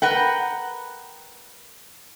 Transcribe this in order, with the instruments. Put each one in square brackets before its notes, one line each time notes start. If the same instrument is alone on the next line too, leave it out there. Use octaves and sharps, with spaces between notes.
[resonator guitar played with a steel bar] A#4 B4 F#5 G5